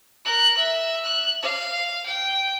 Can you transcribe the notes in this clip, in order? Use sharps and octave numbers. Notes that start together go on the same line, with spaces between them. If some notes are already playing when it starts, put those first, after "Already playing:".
A#4 F#6
E5
F#6
F5
G5